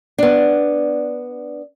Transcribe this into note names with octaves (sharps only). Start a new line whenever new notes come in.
B3 D4